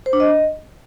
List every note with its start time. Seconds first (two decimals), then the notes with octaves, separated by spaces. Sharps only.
0.06 C5
0.13 D4
0.20 D#5